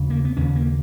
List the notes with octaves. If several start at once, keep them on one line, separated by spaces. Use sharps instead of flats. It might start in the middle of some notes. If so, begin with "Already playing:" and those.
Already playing: D#2 C#3
A#3
B3
D#2 C#3 C#4
A#3